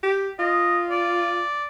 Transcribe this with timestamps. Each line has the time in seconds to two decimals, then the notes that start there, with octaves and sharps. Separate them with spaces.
0.03 G4
0.39 F4 D#5
0.90 D5